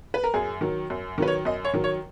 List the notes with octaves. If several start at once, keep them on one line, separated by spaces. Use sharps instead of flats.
B4
A#4
F#2 G#4
D#3 F#3
F#2
D#3 F#3 B4
C#5
F#2 D#5
C#5
D#3 F#3
C#5